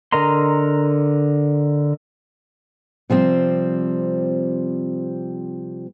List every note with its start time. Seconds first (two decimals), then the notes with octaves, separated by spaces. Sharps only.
0.13 D3 A#4 D#5 A#5 C6
3.10 C3 F3 G3 C4